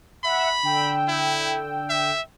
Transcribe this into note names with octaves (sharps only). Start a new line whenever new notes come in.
E5 F#5 B5
D3 G5 E6
E4
E5